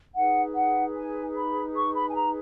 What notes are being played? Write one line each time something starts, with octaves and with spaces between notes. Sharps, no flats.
D#4 G#4 B4 F#5
F#5
G#5
B5
C#6
B5
G#5
A#5